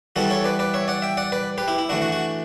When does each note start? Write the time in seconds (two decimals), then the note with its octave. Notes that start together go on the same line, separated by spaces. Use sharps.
0.16 E3 G3 B3 F#4 A4
0.30 A4 C#5
0.44 B4 D5
0.59 B4 D5
0.74 C#5 E5
0.88 D5 F#5
1.02 E5 G5
1.17 D5 F#5
1.32 B4 D5
1.58 G4 B4
1.68 E4 G4
1.78 E4
1.89 E3 A3 D4 F#4
2.01 F#4
2.12 F#4